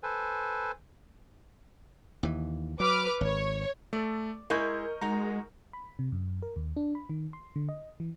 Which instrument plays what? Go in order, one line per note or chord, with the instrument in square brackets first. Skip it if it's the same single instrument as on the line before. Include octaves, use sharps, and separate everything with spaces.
[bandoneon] A4 B4 C5 G#5
[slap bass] D#2 E3
[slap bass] F#3 [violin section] B4 D6 F6
[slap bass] G#1 [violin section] C#5
[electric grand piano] A3 A4 [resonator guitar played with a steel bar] D5
[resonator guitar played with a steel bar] G#3 E4 G#4 [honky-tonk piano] A#4 G6 [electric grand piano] D#5 C#6
[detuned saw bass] G#3 [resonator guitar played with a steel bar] D#4 F#4 [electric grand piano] A#5
[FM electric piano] B5
C3
F#2
A#4
D#2
D4
B5
D#3
C6
D3
D#5
E3